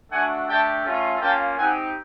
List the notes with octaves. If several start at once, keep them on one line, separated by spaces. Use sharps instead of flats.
A3 D4 F#4 F#5 G#5
A3 D4 G4 G5 A5
A3 C#4 F4
A#3 C#4 F4 G5 A5
C4 D#4 G4 F#5 G#5